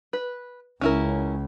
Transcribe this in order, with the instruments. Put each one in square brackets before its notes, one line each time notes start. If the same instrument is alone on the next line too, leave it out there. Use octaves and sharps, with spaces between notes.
[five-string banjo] B4
[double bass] C#2 [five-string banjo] C#4 E4 A#4